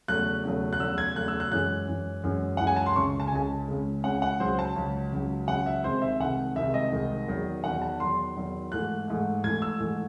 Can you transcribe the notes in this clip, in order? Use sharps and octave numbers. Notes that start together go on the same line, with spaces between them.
E2 C#3 F#3 A3 F#6
E2 C#3 F#3 A3
F#6
E2 C#3 F#3 A3 E6
G#6
E2 C#3 F#3 A3 F#6
E6
F#6
F#2 E3 G#3 F#6
F#2 E3 G#3
F#2 E3 G#3
F#2 E3 G#3 F#5
G#5
A5
C6
C#2 C#3 G#3 C#6
A5
G#5
C#2 C#3 G#3 A5
C#2 C#3 G#3
C#2 C#3 G#3 F#5
F#5
C#2 C#3 F#3 C5
A5
C#2 C#3 F#3
C#2 C#3 F#3
C#2 C#3 F#3 F#5
E5
C2 C3 D#3 G#3 C5
E5
C2 C3 D#3 G#3 F#5
C2 C3 D#3 G#3 E5
D#5
C2 C3 D#3 G#3
E2 D#3 F#3
E2 D#3 F#3 F#5
A5
E2 D#3 F#3 C6
E2 D#3 F#3
G#2 E3 A3 F#6
G#2 E3 A3
G#2 E3 A3 G#6
E6
G#2 E3 A3